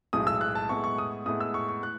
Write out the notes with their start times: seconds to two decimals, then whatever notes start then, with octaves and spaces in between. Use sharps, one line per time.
0.13 B1 A2 G#3 D#6
0.27 E6
0.41 F#6
0.55 A5
0.69 A2 G#3 B3 E4 C#6
0.84 C#6
0.98 D#6
1.26 A2 G#3 B3 E4 D#6
1.40 E6
1.54 C#6
1.68 C#6
1.83 F#6